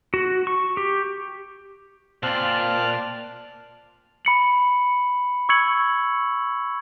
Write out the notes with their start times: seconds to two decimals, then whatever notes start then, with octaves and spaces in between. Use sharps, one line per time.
0.14 F#4
0.47 C#6
0.77 G4
2.23 A#2 C4 F4 D5 A5 C6 F6 F#6
4.25 B5 C#7 F#7
5.49 C#6 E6 G#6 C#7 F#7